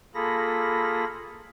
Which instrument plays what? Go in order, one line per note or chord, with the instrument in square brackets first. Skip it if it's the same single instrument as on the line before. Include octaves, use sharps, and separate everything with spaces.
[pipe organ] A#3 F4 G#4 A4 B5 A#6